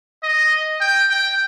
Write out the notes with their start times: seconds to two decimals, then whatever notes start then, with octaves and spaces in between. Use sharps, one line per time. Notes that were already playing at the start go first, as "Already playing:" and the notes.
0.23 D#5
0.81 G5
1.10 G5